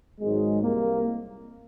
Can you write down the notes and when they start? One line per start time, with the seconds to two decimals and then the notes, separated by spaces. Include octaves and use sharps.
0.21 G#1 G#2 F#3 G#3
0.63 C2 A#3